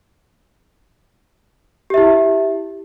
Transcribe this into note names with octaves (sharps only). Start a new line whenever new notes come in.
E4 G4 E5